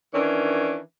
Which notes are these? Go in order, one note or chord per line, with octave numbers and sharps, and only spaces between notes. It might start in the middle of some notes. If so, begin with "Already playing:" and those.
D#3 E3 C#4 D4